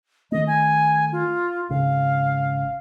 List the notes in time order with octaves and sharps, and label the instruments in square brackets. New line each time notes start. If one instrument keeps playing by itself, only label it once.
[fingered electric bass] D#3 A3 [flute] D#5
[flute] G#5
F4
[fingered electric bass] G#1 G#2 C#3 [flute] F5